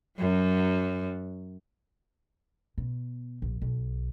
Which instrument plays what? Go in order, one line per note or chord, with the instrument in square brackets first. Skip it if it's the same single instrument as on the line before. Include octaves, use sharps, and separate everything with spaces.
[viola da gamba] F#2 F#3
[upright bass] B2
A#1
B1